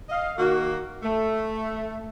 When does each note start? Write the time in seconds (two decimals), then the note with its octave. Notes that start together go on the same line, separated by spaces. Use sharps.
0.09 D#5 F5
0.37 D#3 A#3 F#4
1.02 A3